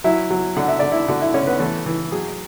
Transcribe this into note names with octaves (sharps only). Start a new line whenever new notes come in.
F#3 E4 E5
F#3
D3 F#5
E5
D3 D5
E4 E5
D3 F#4 F#5
E4 E5
D3 C#4 C#5
B3 B4
E3 A3 A4
E3
F#3 G#4